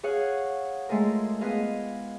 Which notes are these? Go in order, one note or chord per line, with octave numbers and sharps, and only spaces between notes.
G#4 C#5 F5 F#5
G#3 A3 F4 G#4 A#4
B3 G#4 D#5 F5